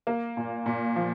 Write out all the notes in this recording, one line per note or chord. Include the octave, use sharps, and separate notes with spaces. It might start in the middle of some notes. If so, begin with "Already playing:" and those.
A#3
A#2
A#2
F3